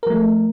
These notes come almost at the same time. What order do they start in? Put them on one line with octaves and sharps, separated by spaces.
A#4 F3 A3